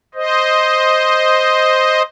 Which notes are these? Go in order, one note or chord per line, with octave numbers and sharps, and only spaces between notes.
C5 D#5